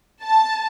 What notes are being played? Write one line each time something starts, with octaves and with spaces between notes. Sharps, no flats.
A5